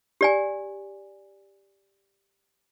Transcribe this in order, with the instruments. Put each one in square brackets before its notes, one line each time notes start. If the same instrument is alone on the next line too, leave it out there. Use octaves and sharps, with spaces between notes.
[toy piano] G4 D5 G#5